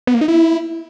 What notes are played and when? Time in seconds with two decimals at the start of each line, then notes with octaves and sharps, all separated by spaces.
0.07 B3
0.14 A#3
0.21 D#4
0.28 E4